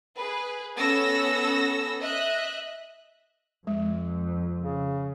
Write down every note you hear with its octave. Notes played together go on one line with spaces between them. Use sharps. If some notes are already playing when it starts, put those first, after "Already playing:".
G#4 B4
B3 C#4 A4 E6 A#6
D#5 E5 F#6
F2 G#3
C#3